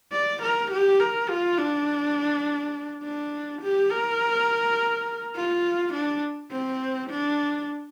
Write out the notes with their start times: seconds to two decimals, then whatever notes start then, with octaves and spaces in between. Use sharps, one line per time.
0.12 D5
0.42 A#4
0.71 G4
1.00 A#4
1.29 F4
1.58 D4
3.03 D4
3.62 G4
3.91 A#4
5.35 F4
5.94 D4
6.51 C4
7.10 D4